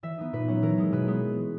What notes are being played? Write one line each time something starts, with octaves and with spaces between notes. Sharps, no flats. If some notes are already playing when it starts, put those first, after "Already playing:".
E3 E5
B3 D#4
A#2 B4
F#3 C#4
E3 A#4
G#3 C#4
B2 B4
G#3 B3